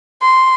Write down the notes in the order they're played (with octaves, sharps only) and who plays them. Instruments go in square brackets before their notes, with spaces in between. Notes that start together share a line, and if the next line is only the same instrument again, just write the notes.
[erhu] C6